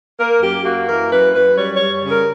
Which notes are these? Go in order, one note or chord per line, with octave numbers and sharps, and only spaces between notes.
A#3 A#4
F#2 G4
A#3 F#4
E3 A#4
F#2 B4
F#2 B4
G3 C#5
C#5
G3
C#3
A#4